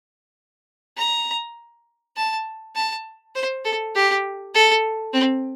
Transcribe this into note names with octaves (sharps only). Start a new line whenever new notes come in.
A#5
A5
A5
C5
A4
G4
A4
C4